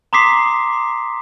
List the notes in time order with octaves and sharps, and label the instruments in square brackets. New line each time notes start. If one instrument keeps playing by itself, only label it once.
[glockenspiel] A#5 C6 D6 D#6 B6 C7